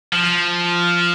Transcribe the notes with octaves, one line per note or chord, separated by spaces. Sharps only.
F3